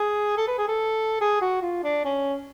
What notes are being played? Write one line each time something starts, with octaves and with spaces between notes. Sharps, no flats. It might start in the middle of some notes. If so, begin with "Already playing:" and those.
Already playing: G#4
A4
B4
G#4
A4
G#4
F#4
F4
D4
C#4